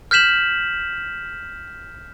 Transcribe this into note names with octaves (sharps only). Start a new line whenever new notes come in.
F6 G6 B6 E7 F#7